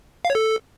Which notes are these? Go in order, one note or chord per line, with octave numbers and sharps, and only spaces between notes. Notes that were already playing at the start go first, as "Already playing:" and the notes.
F5
C#5
A4